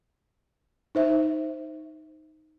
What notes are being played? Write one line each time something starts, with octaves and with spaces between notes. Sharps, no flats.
D#4 C5 E5